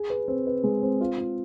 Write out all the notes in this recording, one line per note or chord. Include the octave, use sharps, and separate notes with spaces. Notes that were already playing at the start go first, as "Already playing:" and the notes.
Already playing: G#4
B4
C4
B4
G#3
C4
F4
F4